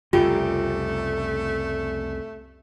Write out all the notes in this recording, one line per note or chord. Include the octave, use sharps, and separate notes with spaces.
C2 F2 C#3 A3 F4 G4